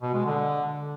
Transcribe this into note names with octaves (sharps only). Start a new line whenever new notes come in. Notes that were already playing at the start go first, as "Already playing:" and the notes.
B2
G#3
D3